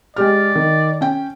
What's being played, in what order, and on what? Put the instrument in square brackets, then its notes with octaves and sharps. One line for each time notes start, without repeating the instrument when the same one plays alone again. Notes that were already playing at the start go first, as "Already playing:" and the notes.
[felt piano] G#3 G4 F6 [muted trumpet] D5
[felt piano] D#3
C#4 G5